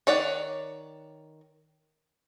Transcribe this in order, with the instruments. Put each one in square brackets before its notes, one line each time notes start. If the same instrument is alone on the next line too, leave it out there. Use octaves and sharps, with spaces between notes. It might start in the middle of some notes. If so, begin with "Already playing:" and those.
[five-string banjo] D#3 C#5 D5 F#5